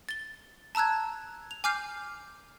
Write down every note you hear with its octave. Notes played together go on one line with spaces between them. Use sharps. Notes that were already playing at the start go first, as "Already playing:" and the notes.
A6 G7
A5 A#5 E6 F#6 G#6
F7
G#5 D6 F6 G6 C7